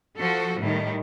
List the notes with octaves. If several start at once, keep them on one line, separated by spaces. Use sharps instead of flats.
F3 F#4 A4
A2 D#3 G3